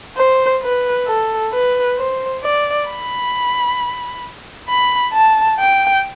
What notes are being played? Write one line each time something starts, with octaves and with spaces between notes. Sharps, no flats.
C5
B4
A4
B4
C5
D5
B5
B5
A5
G5